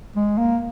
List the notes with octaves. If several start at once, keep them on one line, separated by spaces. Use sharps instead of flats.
G#3
A#3